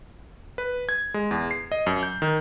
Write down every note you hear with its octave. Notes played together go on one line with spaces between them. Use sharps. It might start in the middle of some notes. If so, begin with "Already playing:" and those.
B4
G#6
G#3
E2
C7
D#5
F#2
G6
D#3